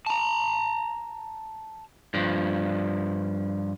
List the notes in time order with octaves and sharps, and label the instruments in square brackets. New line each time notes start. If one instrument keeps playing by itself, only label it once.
[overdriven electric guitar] A5 A#5
[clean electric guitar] G2 F3